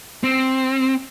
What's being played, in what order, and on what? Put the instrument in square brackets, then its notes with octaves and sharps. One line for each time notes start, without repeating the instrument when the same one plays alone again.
[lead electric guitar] C4